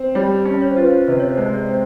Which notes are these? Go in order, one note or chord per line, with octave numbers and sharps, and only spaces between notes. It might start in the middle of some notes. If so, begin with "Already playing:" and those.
Already playing: C4
G3 C#5
C#4
C#5
C5
F4 B4
C5
C3 B4
C#5
C5
G#3
D5
C4